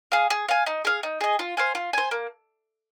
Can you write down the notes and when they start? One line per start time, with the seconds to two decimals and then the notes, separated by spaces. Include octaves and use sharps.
0.12 G#4 F5
0.30 G#4
0.49 F5 G#5
0.66 D#4
0.85 G#4 F5
1.03 D#4
1.21 G#4 D#5
1.39 F4
1.57 C5 F5 G#5
1.75 F4
1.93 C5 G#5
2.11 A#3